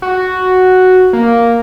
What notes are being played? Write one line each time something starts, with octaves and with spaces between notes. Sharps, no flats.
F#4
A#3